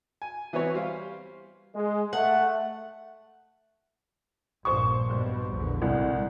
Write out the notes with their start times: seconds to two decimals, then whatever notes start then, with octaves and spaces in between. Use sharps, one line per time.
0.22 G#5
0.53 E3 B3 C4 F#4 C#5
0.74 G3 C5 F5
1.74 G#3
2.13 A3 F#5
4.65 A#1 G2 A#2 C5 C#6
5.06 G2 B2 G3
5.52 A#1 E2 D3
5.82 C2 G#2